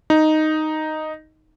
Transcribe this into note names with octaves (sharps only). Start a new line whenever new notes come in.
D#4